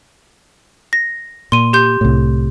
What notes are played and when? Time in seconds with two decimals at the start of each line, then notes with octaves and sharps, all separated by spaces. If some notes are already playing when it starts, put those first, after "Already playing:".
0.93 A#6
1.52 A#2 C6 D#7
1.73 G4 C6 G6
2.01 C2 A2